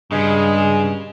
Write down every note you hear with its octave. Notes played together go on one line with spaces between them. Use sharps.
G2 C#3 G#3